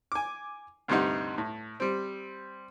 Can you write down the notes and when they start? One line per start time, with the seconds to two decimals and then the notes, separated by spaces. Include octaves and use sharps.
0.12 G#5 D6
0.88 D2 G2 C3 G3 D#4 F#5
1.38 A2
1.80 G3 C4